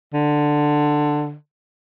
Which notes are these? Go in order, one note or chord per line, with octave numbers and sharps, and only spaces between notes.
D3